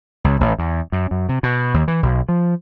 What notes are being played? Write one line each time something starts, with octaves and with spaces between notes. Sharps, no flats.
C#2
A1
E2
F#2
F#2
C3
B2
D#2
E3
B1
F3